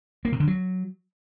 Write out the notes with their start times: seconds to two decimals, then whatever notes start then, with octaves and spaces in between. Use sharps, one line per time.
0.25 A#3
0.32 C3
0.40 D3
0.47 F#3